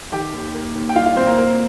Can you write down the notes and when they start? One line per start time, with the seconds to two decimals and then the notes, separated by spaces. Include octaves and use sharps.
0.12 D#3 G4 G5
0.33 D#2
0.54 A#3
0.75 D#2
0.89 G5
0.96 G3 F4 F5
1.06 F4 F5
1.16 A#2 C4 C5
1.27 A#3 A#4
1.37 A#3 A#4